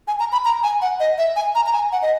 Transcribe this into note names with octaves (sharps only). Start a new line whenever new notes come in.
G#5
A#5
B5
A#5
G#5
F#5
D#5
E5
G#5
A#5
A#5
G#5
F#5
D#5